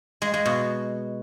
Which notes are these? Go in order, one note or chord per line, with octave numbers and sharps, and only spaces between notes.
G#3
G#3
B2